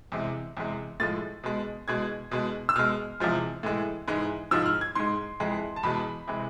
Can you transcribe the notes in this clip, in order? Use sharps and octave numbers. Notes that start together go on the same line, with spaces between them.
E2 C3 G#3
E2 C3 G#3
A2 F3 G#3 A6
B2 G#3
B2 G#3 G#6
B2 G#3
E6
B2 G#3 F6
E2 C3 F3 G#3
A2 E3 G#3
G#2 E3 G#3
G#2 F3 G#3 E6
F6
G#6
G#2 G#3 C6
F2 E3 G#3
A5
E2 B2 G#3 B5
C3 E3 G#3